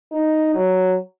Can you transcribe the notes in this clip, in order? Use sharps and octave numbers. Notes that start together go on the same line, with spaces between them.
D#4
F#3